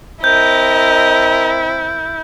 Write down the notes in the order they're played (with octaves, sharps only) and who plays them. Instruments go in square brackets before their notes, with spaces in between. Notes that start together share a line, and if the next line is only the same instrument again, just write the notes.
[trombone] C4 [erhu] E4 [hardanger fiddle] A#4 D#5 [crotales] G6